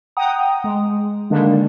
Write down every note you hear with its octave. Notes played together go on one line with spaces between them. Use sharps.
F#5 G5 A#5 D#6
G#3
D3 D#3 G3 G#3 A#3 D4